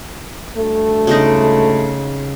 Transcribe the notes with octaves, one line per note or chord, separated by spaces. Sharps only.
D2 G2 A3
C#3 G#3 D#4